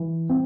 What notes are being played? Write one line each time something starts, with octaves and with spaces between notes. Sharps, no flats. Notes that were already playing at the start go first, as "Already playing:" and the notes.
Already playing: E3
C4